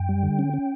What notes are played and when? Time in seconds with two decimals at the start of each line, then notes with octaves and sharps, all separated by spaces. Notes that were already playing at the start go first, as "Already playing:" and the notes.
Already playing: F#2 G5
0.09 G3
0.23 D3
0.39 C#4
0.53 C#4